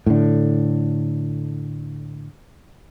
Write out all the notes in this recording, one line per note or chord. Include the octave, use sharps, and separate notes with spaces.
A2 D3